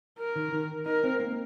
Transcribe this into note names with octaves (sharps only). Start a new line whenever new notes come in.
A#4
D#3
D#3
D#4 A#4
C4
A#3